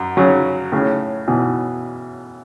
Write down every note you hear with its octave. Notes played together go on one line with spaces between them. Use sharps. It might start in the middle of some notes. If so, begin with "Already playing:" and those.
Already playing: F#2
C#3 F#3
A2 C#3
B2 E3